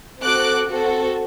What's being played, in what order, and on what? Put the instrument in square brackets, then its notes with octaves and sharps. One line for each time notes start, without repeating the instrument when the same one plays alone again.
[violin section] C4 F#4 A4 D6 F#6
C4 F#4 A4